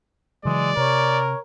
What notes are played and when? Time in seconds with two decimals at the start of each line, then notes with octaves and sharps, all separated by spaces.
0.45 C#3 E3 F#3 G#3 D5
0.77 C3 A#4 C#5